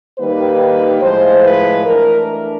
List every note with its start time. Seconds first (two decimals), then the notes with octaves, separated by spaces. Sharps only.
0.19 D#3 G3 A#3 D#4 B4
1.02 A2 F3 G#3 C5
1.44 B4
1.85 E3 A3 D4 A#4
2.27 A#4